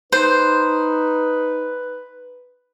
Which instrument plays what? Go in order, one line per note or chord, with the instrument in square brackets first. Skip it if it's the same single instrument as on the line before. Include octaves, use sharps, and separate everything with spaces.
[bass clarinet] D#4 [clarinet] B4 [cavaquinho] C5